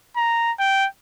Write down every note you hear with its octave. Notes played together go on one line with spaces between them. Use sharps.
A#5
G5